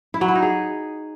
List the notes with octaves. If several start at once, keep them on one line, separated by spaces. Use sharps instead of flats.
E4
F#3
E4
D#4
G#4